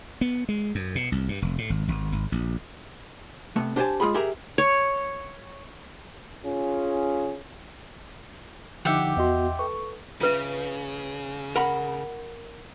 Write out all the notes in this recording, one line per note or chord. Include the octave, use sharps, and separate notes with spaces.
B3
G#3
F#2
B2
C2
G2
F1
A2
G#1
G#1
G#1
A#1
C3 A3 B3
D4 G4 C5 C#5 G#5 A5
G#3 F4 G#4 B5
G4 G#4 A#4 E5 A#5
C#5
C#4 F4 G#4
D3 F3 D#4 G4 E5 F#5 D6
E2 B3 F#4 D#5 C6
A4 B4 C#6
C#3 F4 B4 E5
A#4 F#5 B5